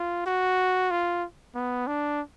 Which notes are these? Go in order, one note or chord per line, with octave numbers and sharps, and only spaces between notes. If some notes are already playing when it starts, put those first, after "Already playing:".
Already playing: F4
F#4
F4
B3
D4